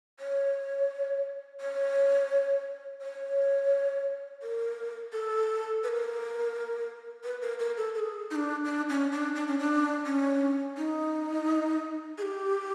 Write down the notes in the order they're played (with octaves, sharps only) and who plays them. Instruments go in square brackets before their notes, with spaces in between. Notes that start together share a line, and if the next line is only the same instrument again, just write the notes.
[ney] C#5
C#5
C#5
A#4
A4
B4
A#4
B4
A#4
A#4
A4
A4
G#4
D#4
D4
D4
C#4
D4
D4
C#4
D4
C#4
D#4
G#4
G4